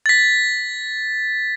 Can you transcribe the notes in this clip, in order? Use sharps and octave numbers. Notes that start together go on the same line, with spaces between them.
A6 B6